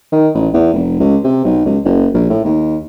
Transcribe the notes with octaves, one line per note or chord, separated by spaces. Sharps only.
D#3
A1
E2
F1
C#2
C3
B1
C#2
F#1
A#1
A2
D#2